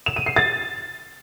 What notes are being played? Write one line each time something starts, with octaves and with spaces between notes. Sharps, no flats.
E7
D#7
C7
A6